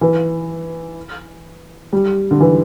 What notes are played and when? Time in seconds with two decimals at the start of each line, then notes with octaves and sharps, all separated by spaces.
0.01 E3
1.93 G3
2.31 D3
2.40 E3